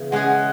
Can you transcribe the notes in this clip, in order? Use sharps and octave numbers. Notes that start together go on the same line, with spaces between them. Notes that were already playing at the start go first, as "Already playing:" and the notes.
Already playing: C#3 E3 B3
G#3 C#4 G#4 F#5